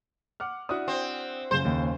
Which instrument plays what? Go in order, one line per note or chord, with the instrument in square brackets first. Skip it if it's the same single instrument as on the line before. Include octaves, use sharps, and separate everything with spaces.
[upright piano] F#5 D6 F6
[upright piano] D4 E4 F#4 [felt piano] D#6
[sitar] C4
[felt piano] F#1 C#3 [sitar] C5
[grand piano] D#2